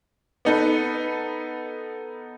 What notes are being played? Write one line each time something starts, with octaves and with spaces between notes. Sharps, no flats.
B3 D#4 A4 B4